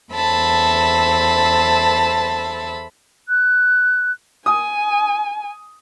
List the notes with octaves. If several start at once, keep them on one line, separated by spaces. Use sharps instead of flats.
E2 A4 C5 E5 A5 B5
F#6
G#5 D#6